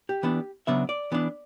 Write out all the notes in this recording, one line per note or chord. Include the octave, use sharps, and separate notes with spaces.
G4
E3 B3 D4
C#3 F#3 B3 D4 E5
D5
E3 B3 D4